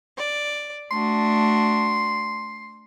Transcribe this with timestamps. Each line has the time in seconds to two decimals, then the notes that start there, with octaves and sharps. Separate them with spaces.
0.19 D5
0.91 A3 D4 F#4 C6